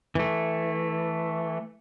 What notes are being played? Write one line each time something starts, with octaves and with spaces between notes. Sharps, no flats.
E3 A3